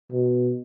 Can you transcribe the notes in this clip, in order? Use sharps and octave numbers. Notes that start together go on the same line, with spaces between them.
B2